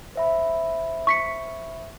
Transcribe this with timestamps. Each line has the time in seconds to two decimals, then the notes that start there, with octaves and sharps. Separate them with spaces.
0.16 C5 E5 B5
1.07 C#6 B6 C#7